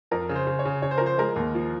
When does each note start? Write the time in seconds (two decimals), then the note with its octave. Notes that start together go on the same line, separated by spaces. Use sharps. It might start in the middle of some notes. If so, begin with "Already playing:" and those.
0.11 F2 A#4
0.29 C#3
0.35 C5
0.47 C#3
0.59 C#5
0.65 C#3
0.82 C#3 C#5
0.91 C5
0.98 A#4
1.01 F3
1.06 C5
1.18 G#3 A#4
1.36 D#2
1.55 F3